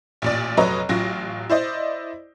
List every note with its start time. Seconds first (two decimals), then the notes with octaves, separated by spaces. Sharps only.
0.22 A1 A#2 D5
0.57 F1 F#3 B4 C#5 D#5 A#5
0.89 A1 F#3 F4 A#6
1.49 E4 C5 D5 D#5